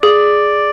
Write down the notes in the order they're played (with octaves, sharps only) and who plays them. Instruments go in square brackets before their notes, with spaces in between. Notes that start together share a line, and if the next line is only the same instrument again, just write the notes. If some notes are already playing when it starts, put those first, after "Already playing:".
[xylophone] G#4 [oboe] D5